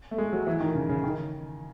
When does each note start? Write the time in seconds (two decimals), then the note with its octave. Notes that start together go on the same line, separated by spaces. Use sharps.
0.11 A3
0.18 G#3
0.33 F#3
0.47 E3
0.60 D#3
0.75 C#3
0.89 C#3
1.04 D#3